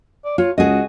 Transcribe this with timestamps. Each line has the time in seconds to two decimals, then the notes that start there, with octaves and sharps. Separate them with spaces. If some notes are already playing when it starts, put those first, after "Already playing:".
0.24 D5
0.38 F4 C#5
0.58 C#2 F#4 G#4 D#5